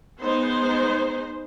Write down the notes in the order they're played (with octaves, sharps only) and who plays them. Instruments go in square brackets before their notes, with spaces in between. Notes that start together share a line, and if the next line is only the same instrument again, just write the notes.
[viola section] G#3 B3 D#4 C5